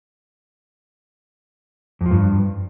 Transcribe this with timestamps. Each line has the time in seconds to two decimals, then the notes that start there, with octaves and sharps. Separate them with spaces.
2.01 F2
2.06 F3
2.11 G2